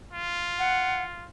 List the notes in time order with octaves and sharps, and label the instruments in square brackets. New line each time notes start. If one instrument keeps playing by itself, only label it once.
[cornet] F4
[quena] F#5